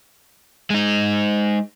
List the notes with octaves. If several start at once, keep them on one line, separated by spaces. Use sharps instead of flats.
G#3 D#4